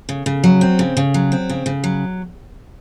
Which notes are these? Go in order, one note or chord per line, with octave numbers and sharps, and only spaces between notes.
C#3
C#3
F#3
C4
C#3
C#3
F#3
C4
C#3
C#3
F#3